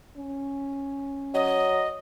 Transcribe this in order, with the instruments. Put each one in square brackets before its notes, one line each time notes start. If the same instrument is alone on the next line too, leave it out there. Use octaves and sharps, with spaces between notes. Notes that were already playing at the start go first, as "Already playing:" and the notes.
[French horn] C#4
[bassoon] F#3 [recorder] D#5